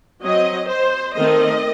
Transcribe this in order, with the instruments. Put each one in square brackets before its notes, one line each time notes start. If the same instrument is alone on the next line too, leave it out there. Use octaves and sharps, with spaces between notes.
[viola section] F#3 C4 D#5
C5
D#3 A3 C4 D#5